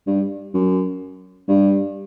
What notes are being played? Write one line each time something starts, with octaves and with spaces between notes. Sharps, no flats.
G2
F#2
G2